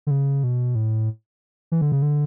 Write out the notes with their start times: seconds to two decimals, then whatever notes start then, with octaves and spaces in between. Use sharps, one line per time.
0.07 D3
0.11 C#3
0.44 B2
0.75 A2
1.72 E3
1.81 D3
1.92 C#3
2.02 D3